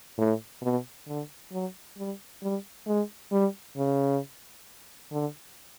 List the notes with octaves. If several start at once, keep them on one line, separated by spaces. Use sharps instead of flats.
A2
B2
D3
F#3
G3
G3
G#3
G3
C#3
D3